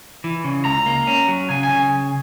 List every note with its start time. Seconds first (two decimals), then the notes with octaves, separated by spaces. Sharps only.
0.24 E3
0.44 C#3
0.65 C#2 A#5
0.86 A#3
1.07 C#4
1.28 F#3
1.49 C#3 G#5
1.64 G#5
1.70 C#3